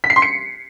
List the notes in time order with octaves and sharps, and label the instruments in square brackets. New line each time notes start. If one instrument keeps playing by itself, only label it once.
[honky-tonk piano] B6
C7
C6
C#7